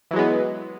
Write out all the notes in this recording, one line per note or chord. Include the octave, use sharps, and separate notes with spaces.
E3 F#3 G#3 B3